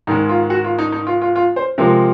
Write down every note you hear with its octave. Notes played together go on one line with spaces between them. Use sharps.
G#2 D#3 G#3 D#4
F4
F#4
F4
D#4
D#4
F4
F4
F4
C5
C3 F3 G#3 A#4